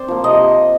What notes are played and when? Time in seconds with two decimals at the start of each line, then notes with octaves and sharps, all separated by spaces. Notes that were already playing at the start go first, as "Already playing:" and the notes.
Already playing: C4 C5 D5
0.08 F3 A#3
0.24 C3 D#5